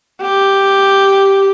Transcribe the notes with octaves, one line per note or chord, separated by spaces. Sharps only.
G4